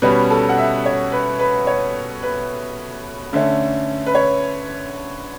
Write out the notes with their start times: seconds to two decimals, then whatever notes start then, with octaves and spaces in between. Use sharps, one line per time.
0.02 B2 G3 C#4 B4
0.30 A4
0.49 F#5
0.58 E5
0.86 C#5
1.12 B4
1.39 B4
1.67 C#5
2.23 B4
3.33 D3 A3 C#4
4.06 B4
4.15 C#5